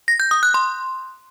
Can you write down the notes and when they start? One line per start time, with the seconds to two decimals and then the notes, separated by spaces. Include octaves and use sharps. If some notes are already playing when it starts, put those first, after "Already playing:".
0.08 A#6
0.20 G6
0.31 D#6
0.43 F#6
0.54 C6